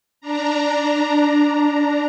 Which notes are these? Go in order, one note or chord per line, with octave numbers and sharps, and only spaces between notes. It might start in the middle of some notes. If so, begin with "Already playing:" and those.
D4 A#5